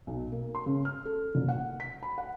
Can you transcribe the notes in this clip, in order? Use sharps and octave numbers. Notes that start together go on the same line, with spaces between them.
B1
A#3
C6
C#3
F6
A4
F#1
F#5
B6
B5
F#5